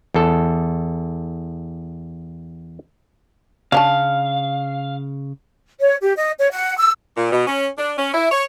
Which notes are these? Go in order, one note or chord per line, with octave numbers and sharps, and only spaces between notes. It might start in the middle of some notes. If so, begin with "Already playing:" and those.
E2 A4
C#3 C#4 D4 F5 A5
C#5
G4
D#5
C#5
F#5
E6
A#2
B2
C#4
D4
C#4
E4
C#5